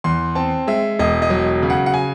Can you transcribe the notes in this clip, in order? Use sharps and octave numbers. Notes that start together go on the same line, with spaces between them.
E2 C6
C4 A5
G#3 E5
E1 D#5
D#5
F#3
C#3
F#5
F#5
G#5